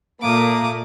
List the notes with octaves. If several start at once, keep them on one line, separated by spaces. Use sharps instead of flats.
A#2 A3 A#3 D6 D#6